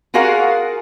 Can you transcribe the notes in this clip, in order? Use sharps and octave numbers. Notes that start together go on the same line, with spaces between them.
F4 F#4 G#4 A#4 F5 F#5